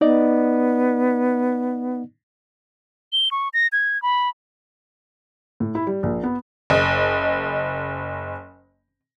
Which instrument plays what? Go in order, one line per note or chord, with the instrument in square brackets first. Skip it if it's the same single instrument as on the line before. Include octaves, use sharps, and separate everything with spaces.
[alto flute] B3 [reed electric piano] D#4 D5 D#5
[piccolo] G7
C#6
A#6
G#6
B5
[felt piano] A2
E4
G3
A#1
B3
[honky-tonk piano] F#1 D#5